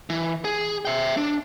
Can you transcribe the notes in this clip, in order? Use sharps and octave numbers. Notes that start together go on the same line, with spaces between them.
E3
G#4
E5 G5
D4